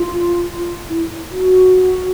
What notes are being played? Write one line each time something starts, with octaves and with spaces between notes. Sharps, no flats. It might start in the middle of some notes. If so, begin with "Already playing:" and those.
Already playing: F4
E4
F#4